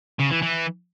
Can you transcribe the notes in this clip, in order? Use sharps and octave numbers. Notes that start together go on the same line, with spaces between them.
C#3
E3
E3